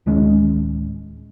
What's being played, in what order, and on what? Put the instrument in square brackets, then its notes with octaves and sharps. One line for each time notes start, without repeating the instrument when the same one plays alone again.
[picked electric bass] D1 D#3 G#3 C#4